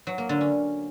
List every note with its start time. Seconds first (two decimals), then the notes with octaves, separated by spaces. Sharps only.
0.07 F#3
0.18 A#3
0.29 D3
0.41 C#4